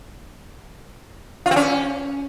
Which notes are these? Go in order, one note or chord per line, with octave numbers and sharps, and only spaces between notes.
F4
C4
C#4